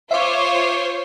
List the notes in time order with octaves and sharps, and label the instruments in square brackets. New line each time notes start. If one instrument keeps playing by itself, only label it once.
[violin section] F4 C5 C#5 [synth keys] E5 F5 D6